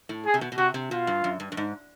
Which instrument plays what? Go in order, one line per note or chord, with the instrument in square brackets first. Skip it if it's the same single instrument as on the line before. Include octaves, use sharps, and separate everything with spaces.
[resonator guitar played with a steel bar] A2
[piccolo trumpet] G#4
[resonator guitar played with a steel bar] C3
B2
B2
[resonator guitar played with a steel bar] C3 [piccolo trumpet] F#4
[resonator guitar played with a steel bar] C3
[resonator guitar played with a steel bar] B2 [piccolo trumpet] F4
[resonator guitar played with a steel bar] G2
F#2
G2
G2
G#2